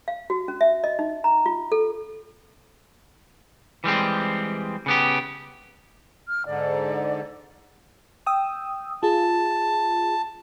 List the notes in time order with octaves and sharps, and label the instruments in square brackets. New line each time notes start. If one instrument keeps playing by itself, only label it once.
[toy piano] F5
F#4
C#4
E5
D#5
D#4
A#5
F4
A4
[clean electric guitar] E3 G3 G#3 C4
C#3 B3 G4
[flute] F6
[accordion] G#2 D3 [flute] D5
[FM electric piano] G5 D#6 E6
[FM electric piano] F4 G#4 [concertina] A5